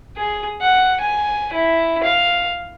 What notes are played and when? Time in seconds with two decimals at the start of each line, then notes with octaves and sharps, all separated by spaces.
0.17 G#4
0.61 F#5
1.01 G#5
1.53 E4
2.03 F5